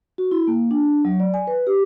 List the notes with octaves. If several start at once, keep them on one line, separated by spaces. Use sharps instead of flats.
F#4
E4
A#3
D4
F#3
D5
G#5
B4
G4